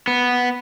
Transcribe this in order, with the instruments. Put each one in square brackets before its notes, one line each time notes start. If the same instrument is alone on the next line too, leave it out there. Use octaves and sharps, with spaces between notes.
[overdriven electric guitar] B3